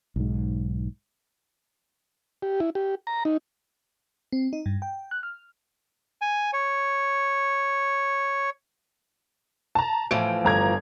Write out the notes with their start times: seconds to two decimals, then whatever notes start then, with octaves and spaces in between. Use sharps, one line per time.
0.16 B1 G#2
2.42 G4
2.60 E4
2.75 G4
3.07 A#5
3.25 D#4
4.32 C4
4.53 D#4
4.66 G2
4.82 G5
5.11 F#6
5.23 F6
6.21 G#5
6.53 C#5
9.75 A5 A#5
10.11 A2 E3 F3 D7
10.45 G1 A#5 G#6